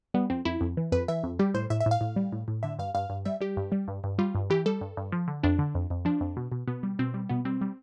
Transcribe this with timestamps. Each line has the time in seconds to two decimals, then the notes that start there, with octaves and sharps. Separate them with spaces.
0.14 G3 B3
0.30 F2 C4
0.45 F2 E4
0.61 F2
0.77 E3
0.92 F2 B4
1.08 E3 E5
1.24 F2
1.39 G3 G4
1.54 A2 C5
1.70 A2 E5
1.80 E5
1.86 A2
1.91 F5
2.01 A2
2.16 G3
2.32 A2
2.48 A2
2.63 D3 E5
2.79 G2 F5
2.95 G2 F5
3.10 G2
3.25 G3 E5
3.40 G3 G4
3.57 G2
3.72 G3
3.88 G2
4.04 G2
4.18 G3 F4
4.35 G2
4.50 E3 G4
4.66 G3 A4
4.81 G2
4.97 G2
5.12 F3
5.28 D3
5.43 F2 D4
5.59 D3
5.75 F2
5.90 F2
6.05 F3 D4
6.21 F2
6.37 B2
6.52 B2
6.68 B2 B3
6.83 G3
6.99 B2 C4
7.14 G3
7.29 B2 B3
7.45 G3 C4
7.61 G3